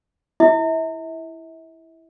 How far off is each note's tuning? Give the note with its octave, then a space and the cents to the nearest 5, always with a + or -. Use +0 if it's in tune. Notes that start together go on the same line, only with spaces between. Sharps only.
E4 +0 E5 -40